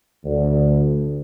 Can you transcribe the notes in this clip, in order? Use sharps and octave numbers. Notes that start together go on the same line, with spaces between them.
D2